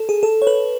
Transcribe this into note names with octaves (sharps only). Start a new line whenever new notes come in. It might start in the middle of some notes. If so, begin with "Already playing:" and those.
Already playing: A4
G#4
A4
C#5
B4